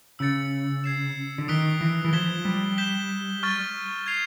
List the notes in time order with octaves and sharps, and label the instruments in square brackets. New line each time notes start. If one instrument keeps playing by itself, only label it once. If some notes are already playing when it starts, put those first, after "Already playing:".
[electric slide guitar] C#3 [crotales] E6 A6 C#7
[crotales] G#6 C7 E7
[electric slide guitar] D3
[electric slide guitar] D#3 [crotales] D#6 F#6 B6 D7 G7
[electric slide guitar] E3
E3
[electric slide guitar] F3 [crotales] G#6 B6 E7 G7
[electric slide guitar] G3
[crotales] G6 B6 E7 G7
C#6 F6 A6
G#6 C7 F7